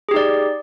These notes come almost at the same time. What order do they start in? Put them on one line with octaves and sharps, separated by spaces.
G#4 G4 D#4 D5